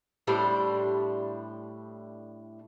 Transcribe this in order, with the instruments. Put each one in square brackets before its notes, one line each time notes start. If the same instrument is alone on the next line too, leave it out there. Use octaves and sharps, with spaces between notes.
[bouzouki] A2 G3 D4 C5